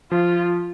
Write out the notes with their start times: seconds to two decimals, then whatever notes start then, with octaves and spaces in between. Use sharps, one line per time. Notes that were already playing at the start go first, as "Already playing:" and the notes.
0.11 F3 F4